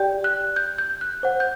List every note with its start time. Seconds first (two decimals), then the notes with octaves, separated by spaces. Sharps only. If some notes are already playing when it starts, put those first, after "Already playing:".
Already playing: G4 D5 G5 G6
0.24 F#6
0.56 G6
0.78 G6
1.01 F#6
1.23 C5 F#5
1.40 G6